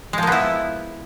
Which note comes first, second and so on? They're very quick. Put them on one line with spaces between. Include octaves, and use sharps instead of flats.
G#3 F3 A#3 B3 E4